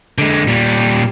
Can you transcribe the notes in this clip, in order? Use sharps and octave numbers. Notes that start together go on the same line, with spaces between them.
D3 G#3
A#2 G3